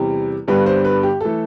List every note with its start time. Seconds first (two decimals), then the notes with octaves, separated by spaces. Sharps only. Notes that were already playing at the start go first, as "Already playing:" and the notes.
Already playing: E2 C3 G3 G4
0.48 G2 D3 G3 B3 D4 B4
0.66 C5
0.85 B4
1.03 G4
1.21 E3 A3 A4